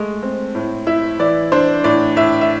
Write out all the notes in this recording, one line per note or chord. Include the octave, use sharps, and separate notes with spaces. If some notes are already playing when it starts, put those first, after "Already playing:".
Already playing: G#3 A3
C4
A2
E4 E5
E3 D5
D4 C5
A2 D5
A2 E5
E5